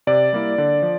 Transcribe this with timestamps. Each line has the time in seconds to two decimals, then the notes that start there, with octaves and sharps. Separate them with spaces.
0.07 C3 D5
0.33 G3 A#3 E4
0.58 D3
0.82 F3